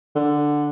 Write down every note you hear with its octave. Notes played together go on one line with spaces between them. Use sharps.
D3